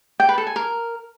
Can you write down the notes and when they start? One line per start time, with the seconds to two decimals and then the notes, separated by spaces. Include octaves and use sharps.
0.20 G5
0.29 B4
0.38 A4
0.47 G#5
0.56 A#4